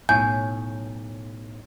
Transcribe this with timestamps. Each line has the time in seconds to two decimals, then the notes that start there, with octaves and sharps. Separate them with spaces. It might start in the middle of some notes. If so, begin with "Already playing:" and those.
0.09 B1 A2 C#5 G#5 G6